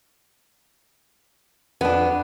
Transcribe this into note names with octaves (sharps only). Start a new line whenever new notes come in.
F2 B3 D4